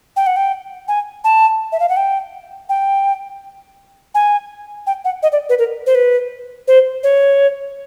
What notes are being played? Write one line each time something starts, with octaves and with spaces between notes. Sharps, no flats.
G5
F#5
G5
G#5
A5
E5
F5
F#5
G5
G5
G#5
G5
F#5
D#5
D5
B4
A#4
C5
B4
C5
C#5